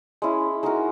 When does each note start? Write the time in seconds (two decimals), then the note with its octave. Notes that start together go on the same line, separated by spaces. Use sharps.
0.22 G#3 C#4 E4
0.63 G#3 D#4 F#4 A#4